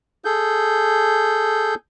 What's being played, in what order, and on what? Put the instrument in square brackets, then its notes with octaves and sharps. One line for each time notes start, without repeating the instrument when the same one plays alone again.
[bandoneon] G#4 A4 G6